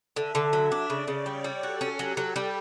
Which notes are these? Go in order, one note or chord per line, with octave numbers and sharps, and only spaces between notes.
D3 E5
D3
F#3
D4
C#3 D5
C#3
G3 C#5
G3
F#4 A4
C#4
F#3 G4
F#3
G3